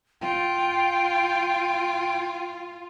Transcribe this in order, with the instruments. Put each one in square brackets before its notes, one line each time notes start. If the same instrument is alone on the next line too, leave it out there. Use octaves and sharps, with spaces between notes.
[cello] F4 [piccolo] G5